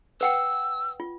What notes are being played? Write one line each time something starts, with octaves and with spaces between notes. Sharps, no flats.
B4 F#5 G5 E6
F4